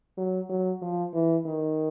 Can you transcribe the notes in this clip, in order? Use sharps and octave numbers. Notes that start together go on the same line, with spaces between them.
F#3
F#3
F3
E3
D#3